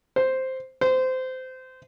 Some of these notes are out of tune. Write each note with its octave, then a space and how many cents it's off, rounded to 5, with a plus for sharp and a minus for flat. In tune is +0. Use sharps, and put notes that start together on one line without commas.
C5 +0
C5 -20